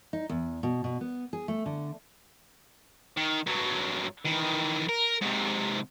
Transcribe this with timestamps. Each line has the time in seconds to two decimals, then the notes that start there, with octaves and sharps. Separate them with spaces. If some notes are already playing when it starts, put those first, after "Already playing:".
0.13 D#4
0.29 E2
0.63 B2
0.84 B2
1.01 B3
1.33 G#4
1.48 A3
1.66 D3
3.17 D#3
3.47 G2 F#3
4.25 D#3 E3
4.89 A#4
5.21 G#2 C3